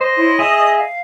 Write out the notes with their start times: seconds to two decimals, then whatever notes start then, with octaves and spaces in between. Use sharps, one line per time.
0.01 C5 D#5
0.17 E4 C#5 C6
0.39 G#4 E5 D#6
0.77 F5